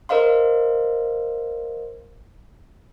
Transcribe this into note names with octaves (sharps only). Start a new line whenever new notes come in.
A#4 C5 D#5 F5 C6